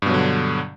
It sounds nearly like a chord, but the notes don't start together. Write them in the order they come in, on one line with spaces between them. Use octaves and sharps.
G2 B2 F#3 D3